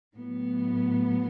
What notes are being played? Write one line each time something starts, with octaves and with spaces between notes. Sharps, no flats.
A2 F#3 B3